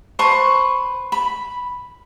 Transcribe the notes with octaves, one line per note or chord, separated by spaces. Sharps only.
B4 C5 A5 C#6
B5